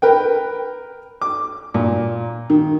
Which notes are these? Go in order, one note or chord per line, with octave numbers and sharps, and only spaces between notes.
A#4 B4 G5
D6
A#2
D#3